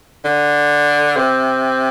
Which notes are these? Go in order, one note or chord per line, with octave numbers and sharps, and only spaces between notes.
D3
C3